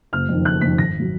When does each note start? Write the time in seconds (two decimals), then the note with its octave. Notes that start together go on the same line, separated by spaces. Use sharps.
0.13 F#1 F6
0.29 F2 D#3
0.45 F#1 F#6
0.61 F2 D#3 B6
0.78 G#1 A#6
0.99 F#3